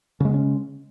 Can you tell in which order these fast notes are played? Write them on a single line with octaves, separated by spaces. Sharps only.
C#3 G#3 B3 C#4